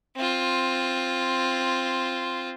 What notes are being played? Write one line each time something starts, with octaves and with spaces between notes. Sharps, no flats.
C4 F4